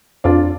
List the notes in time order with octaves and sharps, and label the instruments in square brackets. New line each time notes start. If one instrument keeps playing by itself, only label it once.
[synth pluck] F2 [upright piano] D4 F4